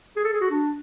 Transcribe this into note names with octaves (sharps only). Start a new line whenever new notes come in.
G#4
A4
G#4
F#4
D4